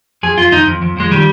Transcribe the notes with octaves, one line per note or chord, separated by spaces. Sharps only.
F2 G#4
F2 F4
F2 D#4
F2
F2
F2 G#3
D#3 G3